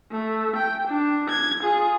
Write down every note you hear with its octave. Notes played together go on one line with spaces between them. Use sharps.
A3
G5
D4
G#6
F4 G#4